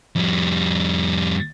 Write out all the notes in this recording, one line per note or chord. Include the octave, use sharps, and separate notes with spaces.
F2 G3